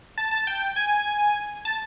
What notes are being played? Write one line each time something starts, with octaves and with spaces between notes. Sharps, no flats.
A5
A5
G5
G#5
A5